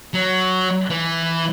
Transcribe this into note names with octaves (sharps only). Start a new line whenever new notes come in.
F#3
E3